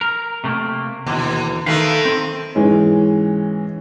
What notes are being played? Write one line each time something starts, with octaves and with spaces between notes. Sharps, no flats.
A#4
C3 A3 A#3
D#2 B2 D3 E3
D#3 A3 B4 F5
C4
G#2 E3 G#3 C#4